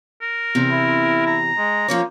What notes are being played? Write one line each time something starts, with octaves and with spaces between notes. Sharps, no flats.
A#4
E2 C3 C4
E4
A#5
G#3
F3 A#3 C#4 C#5